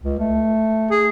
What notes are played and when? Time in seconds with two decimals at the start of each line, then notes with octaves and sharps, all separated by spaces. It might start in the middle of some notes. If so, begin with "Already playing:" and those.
0.03 C#2
0.20 A3
0.91 G#4